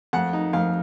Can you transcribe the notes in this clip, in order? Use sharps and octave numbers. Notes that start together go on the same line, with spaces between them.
F2 F#5
D#4
F2 F5